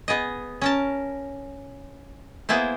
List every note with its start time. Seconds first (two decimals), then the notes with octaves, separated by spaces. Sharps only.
0.08 B3 G#4 D#5
0.61 C#4 A#4 A5
2.49 A#3 B3 E4 G#4 C5